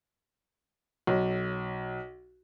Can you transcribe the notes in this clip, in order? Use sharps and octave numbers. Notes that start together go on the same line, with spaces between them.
B1